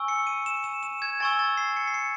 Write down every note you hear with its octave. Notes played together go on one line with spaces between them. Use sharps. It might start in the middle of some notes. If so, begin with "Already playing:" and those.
Already playing: G#5 C#6 E6
C#7
D#7
E7
E7
E7
G#6
G#5 C#6 E6 A6
A6
C7
C#7
C7
C#7